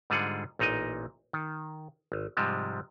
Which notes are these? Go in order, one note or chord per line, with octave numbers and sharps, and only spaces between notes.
G#2 D3 G3 F4 G#4 F#5
A1 A#2 D#4 A#4 D#5
D#3
G#1
G#2 C3 F3 G3 G#3